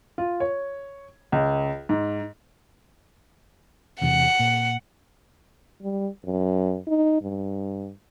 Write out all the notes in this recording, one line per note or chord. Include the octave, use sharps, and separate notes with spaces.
F4
C#5
C#2
G#2
E1 E2 C3 F#5
A#2
G3
F#2
D#4
G2